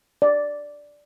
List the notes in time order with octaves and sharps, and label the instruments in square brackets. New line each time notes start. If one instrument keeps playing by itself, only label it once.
[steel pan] D5